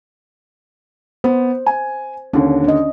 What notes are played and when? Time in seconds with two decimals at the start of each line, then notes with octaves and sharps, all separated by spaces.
1.24 B3 C5
1.66 G#5
2.34 D#2 D3 C#4
2.64 D4 D#5